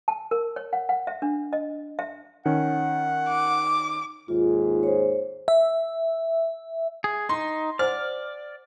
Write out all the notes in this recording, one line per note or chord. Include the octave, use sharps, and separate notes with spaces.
A5
A#4
C#5
F#5
F#5
E5
D4
D#5
E5
D#3 C#4 F#5
D6
D#2 G#2 F4 G#4
C5 C#5
E5
G#4
D#4 C6
C5 D5 F#5 G#5 F6